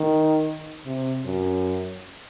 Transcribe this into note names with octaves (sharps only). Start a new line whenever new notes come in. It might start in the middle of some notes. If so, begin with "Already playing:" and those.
Already playing: D#3
C3
F#2